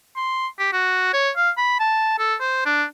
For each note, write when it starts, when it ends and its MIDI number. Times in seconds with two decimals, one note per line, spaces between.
0.16 0.47 84
0.59 0.68 67
0.73 1.11 66
1.14 1.30 73
1.36 1.50 77
1.57 1.79 83
1.80 2.16 81
2.19 2.35 69
2.40 2.65 72
2.66 2.84 62